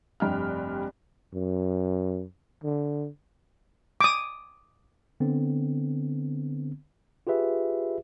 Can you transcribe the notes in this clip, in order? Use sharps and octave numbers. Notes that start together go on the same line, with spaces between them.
F1 G2 G5 F6
F#2
D3
D6 D#6
D3 B3 C4
F4 G4 G#4 B4 E5